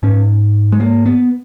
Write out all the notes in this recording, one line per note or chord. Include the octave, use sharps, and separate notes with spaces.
G#2 C#4
G#3
A#3
B3